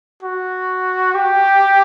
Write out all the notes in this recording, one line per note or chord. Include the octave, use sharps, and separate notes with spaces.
F#4
G4